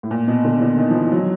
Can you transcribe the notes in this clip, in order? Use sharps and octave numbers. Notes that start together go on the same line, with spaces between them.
A2
A#2
B2
D3
D3
D#3
F3
E3
F#3